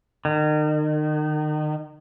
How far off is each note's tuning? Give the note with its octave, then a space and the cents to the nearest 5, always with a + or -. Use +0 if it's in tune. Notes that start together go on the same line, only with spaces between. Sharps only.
D#3 -35